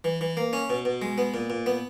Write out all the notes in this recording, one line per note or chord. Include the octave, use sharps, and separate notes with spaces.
E3
E3
A#3
C#4
B2
B2
G#3
B3
A#2
A#2
B3